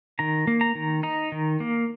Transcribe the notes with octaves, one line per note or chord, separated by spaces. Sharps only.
D#3 A#5
A#3
A#5
D#3
D#4 A#5
D#3
A#3